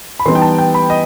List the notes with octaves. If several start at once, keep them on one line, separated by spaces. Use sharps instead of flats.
B5
E3 G3 B3 D#4 C6
G5
A5
G5
B5
D#5